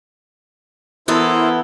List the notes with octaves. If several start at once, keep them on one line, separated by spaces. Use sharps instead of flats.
E3 B3 E4 A4 A#4 C5